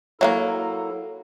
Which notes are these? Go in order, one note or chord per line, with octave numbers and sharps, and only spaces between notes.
F#3 A3 A#3 E4 A4